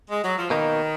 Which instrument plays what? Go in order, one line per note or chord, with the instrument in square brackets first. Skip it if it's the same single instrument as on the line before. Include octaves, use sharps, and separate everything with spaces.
[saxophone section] G#3
F#3
F3
[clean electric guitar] B2 A#3 D#4 [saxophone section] D#3